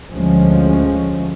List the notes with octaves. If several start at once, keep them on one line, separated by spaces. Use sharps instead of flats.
D2 F3 G#3 C#4